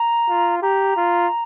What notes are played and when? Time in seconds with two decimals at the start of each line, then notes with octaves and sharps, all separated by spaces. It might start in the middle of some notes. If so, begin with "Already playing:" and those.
Already playing: A#5
0.28 F4
0.62 G4 A#5
0.96 F4